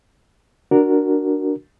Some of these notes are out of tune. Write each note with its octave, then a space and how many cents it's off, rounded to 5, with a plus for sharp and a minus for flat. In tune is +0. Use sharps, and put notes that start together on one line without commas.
D4 +0 F#4 +0 A#4 -5